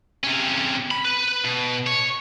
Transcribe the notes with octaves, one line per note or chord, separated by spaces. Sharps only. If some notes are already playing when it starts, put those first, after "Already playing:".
C3 C#4
B5
B4
B2
C#5